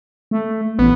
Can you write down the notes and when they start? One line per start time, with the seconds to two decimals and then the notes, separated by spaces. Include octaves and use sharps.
0.31 A3
0.79 A1 B3